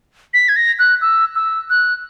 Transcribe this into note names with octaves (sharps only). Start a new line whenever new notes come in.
B6
G#6
A#6
F#6
E6
E6
F#6